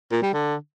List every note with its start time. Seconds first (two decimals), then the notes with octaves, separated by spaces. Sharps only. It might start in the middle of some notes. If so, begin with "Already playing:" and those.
0.12 A#2
0.23 G3
0.33 D3